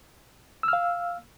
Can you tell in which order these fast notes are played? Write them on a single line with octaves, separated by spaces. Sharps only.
E6 F6 F5